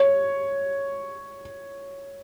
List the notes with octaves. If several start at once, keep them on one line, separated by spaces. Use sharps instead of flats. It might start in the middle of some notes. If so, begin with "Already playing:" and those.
Already playing: C#5